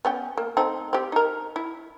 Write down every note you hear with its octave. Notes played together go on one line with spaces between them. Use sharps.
B3 C#4 G5
A#3
A3 C4 D#4
C4 G4
D#4 A#4
E4